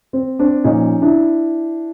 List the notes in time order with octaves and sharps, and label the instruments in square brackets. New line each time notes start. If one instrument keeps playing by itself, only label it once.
[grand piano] C4
C4 D4
A#2 F3 C#4 D#4
D4 E4